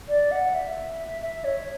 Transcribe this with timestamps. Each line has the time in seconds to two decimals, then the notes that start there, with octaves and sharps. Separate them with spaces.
0.08 D5
0.32 F#5
0.54 E5
1.22 E5
1.44 C#5